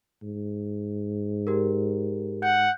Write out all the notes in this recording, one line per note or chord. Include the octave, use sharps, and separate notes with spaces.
G#2
G4 A#4
F#5 G6